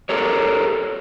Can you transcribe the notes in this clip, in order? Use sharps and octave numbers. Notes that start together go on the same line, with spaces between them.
G4 A4 A#4 C#5